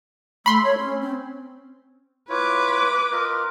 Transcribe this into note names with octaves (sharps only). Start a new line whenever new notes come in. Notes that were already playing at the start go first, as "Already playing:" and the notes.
A3 B5 C6
C#5
C#4
C4
E4 F4 B4 C#5 D6
F4 A#4 D#5